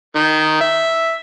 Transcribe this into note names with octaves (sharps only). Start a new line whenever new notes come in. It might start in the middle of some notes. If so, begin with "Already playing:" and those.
D#3
E5